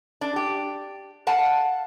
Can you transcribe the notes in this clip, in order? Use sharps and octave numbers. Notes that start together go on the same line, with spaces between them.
D4
G4
F5 F#5 A5